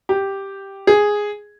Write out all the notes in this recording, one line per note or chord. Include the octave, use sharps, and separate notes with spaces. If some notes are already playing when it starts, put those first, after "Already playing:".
G4
G#4